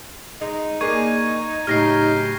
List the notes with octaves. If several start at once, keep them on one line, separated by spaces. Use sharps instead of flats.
G#3 D#4
A#3 D4 G#4 C#6 G#6 D#7
A2 C#3 F#3 D#4 G4 F6 A#6 C7